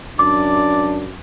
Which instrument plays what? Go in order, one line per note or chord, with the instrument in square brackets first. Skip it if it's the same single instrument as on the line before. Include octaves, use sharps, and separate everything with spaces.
[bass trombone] F#2 [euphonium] D4 [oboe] D5 [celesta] D6